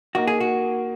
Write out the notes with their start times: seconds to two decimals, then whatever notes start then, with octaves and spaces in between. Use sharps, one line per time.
0.15 A#3 D#4 F#4 A#4
0.27 G#4
0.40 F#4